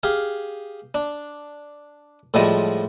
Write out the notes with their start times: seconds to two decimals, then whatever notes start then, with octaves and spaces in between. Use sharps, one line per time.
0.03 G4 G#4 F5
0.94 D4
2.34 A2 F3 G3 G#3 D#5 A5